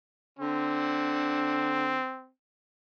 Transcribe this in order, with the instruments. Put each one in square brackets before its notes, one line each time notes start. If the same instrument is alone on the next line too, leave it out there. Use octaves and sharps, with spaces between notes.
[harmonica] D3 [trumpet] C4